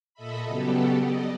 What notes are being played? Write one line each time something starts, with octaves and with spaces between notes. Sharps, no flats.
A#2 A4 D#5 E5 B5
C#3 F#3 G3 B3 G4 A4
D5 D#5